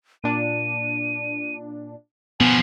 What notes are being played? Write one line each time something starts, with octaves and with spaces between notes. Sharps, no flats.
A#2 D4 D#7
B2 F3 B3 G#5